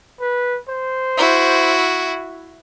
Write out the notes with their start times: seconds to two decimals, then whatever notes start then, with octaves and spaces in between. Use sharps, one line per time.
0.21 B4
0.69 C5
1.17 E4 F#4